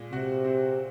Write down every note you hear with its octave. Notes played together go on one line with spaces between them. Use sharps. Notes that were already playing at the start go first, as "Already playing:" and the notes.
Already playing: A#2 G#3
C3 F#4
C4